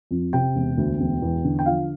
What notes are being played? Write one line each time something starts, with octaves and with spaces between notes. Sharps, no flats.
F2
C3 G5
E1
D2
E1
E2
D3
G5
F3 F5